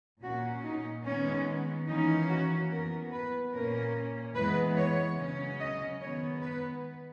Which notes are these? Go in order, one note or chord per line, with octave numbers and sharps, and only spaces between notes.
A#2 A#3 C#4 F#4
D#4
D#3 G#3 B3 C#4
E3 A#3 C#4 D#4
F#4
E3 B3 A#4
B4
A#2 A#3 C#4 A#4
E3 G#3 B3 B4
C#5
C#3 F#3 C#4
D#5
D#3 G#3 B3 C#5
B4